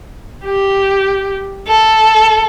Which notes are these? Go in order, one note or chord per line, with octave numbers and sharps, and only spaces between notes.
G4
A4